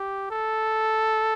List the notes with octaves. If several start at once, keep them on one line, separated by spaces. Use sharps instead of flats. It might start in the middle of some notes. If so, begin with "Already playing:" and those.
Already playing: G4
A4